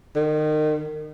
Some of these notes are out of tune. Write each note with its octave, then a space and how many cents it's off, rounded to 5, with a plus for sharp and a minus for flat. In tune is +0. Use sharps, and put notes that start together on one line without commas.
D#3 -30